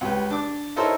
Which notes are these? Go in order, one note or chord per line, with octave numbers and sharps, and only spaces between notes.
C#2 G4 B4
D4 D6
D#4 E4 A4 A#4 C5 C#5